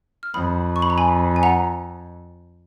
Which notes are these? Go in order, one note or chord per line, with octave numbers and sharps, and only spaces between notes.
F6
F2 B5 D#6
C#6
B5
A#5
G#5 B5
G#5
F#5 A#5